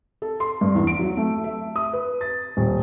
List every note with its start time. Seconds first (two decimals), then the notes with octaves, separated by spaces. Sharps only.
0.22 A4
0.40 C6
0.61 G2
0.75 E2
0.87 D7
0.99 F#3
1.17 A3
1.44 E5
1.76 D#6
1.93 B4
2.21 A6
2.57 D#1